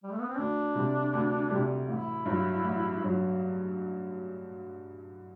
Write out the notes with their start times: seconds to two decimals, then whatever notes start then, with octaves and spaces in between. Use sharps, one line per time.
0.03 G3
0.12 A3
0.20 B3
0.29 C4
0.38 D2 D4
0.75 C3 G3
1.13 D2
1.51 C3 G3
1.88 A1 E4
2.25 G2 F#3
2.63 A1
3.00 G2 F#3